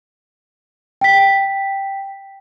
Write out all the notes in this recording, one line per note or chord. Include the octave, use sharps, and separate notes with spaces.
G5 B6